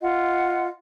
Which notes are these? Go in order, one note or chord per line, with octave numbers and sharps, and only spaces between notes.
F4 D#5 F#5